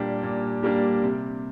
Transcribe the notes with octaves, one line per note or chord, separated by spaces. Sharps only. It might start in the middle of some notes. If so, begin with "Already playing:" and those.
Already playing: A#2 G3 A#3 D4 G4
A#2
G3 A#3 D4 G4
C3